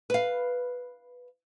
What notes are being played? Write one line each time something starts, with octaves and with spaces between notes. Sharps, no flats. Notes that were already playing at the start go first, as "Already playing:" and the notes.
B4 F5